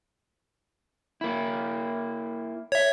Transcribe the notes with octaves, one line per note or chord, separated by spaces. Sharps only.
A#3 E4
C#5 E5